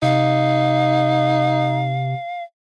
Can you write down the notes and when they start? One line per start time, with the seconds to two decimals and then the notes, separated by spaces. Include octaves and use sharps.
0.02 C3 D#4 F5